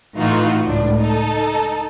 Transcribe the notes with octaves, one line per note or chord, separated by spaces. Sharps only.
A2 E3 D#4 F4 F#4
C#2 A2 D4
D#4 A4